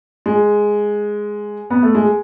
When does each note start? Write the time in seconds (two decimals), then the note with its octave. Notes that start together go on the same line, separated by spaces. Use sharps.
0.26 G#3
1.70 B3
1.82 A3
1.95 G#3